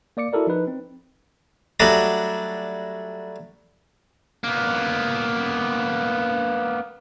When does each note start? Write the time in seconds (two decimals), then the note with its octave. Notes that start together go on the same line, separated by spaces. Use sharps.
0.17 A#3 D5 D6 C#7
0.33 E4 F#4 A4 A#4 D5
0.47 F3 D#4 B4
0.67 C4
1.80 F#3 G3 A3 D4 F#4 D#6
4.44 A#3 B3